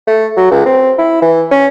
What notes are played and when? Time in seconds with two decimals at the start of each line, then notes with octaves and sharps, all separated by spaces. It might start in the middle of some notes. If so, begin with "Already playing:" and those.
0.07 A3
0.37 F#3
0.51 C#2
0.66 C4
0.98 E4
1.22 E3
1.51 C#4